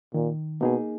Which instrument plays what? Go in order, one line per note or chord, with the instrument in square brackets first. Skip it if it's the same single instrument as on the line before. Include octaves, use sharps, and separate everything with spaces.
[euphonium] A#2 [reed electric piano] D#3
[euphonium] B2 [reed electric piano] A#3 D#4 G#4